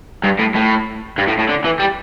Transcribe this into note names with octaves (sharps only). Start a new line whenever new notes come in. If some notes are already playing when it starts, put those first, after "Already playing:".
G2
A2
A2
G2
A2
A2
D3
E3
G3